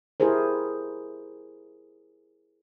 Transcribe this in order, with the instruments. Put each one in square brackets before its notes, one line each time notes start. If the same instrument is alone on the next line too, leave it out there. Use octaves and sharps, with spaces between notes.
[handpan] E4 G4 G#4 A#4 C5